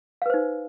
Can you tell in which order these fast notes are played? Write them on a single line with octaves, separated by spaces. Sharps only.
F5 B4 C5 D#4